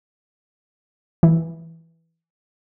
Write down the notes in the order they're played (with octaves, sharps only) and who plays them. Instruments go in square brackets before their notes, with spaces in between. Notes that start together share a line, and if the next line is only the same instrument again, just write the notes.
[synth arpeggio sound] E3